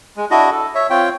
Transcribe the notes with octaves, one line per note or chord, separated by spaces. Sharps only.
G#3
D4 E4 F#4 D#5
A4
C#5 E5
C4 F4 C#5 G5